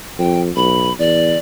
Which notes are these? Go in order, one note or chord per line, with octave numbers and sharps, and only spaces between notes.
F2 G5
B1 B5
E2 D5